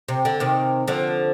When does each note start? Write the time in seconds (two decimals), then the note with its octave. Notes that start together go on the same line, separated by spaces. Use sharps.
0.08 C3
0.25 D3
0.40 C3 D#3
0.88 D3 F3